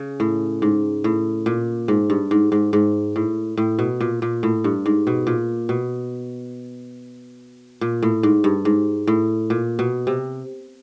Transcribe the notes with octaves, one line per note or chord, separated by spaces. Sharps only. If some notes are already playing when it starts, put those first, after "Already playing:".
Already playing: C#3
A2
G#2
A2
A#2
G#2
G2
G#2
G#2
G#2
A2
A2
B2
A#2
A#2
A2
G2
G#2
B2
A#2
B2
A#2
A2
G#2
G2
G#2
A2
A#2
B2
C3